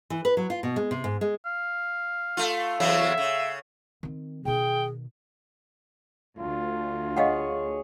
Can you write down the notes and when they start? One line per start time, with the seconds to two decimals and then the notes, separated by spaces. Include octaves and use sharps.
0.10 E3
0.25 B4
0.37 F#3
0.50 F4
0.63 B2
0.76 G#3
0.91 C3
1.04 G#2
1.21 G#3
1.46 F5
2.37 A3 F4
2.80 E2 C#3 F#3 E5
3.18 C#3
4.03 D#3 C4
4.45 B2 D#3 G#4 G5
6.39 D2 F4
7.17 G#4 C#5 D#5 F5 F#5